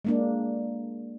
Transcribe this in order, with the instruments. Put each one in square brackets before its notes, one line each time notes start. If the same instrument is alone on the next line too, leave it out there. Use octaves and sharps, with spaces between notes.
[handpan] G#3 A#3 D4